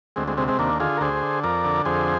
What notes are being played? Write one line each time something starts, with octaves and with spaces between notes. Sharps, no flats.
D2 G#3 C4
G#3 C4
C3 G#3 C4
G#3 C4
D#2 A#3 D4
D3 F4 G#4
A#4
D2 G#4 C5
D3
F2 A#4 D5
D3
F2 G#4 C5